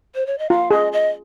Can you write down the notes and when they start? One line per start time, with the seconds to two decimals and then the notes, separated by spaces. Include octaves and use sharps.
0.15 C5
0.26 C#5
0.38 D#5
0.50 F4 F5
0.71 G#4 D#5
0.93 D#5